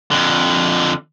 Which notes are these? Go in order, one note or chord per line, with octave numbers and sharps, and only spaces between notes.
F2 D3